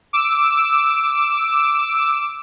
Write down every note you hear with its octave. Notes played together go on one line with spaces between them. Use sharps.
D6 E6